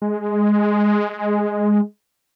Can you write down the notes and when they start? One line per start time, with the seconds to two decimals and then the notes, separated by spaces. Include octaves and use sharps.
0.02 G#3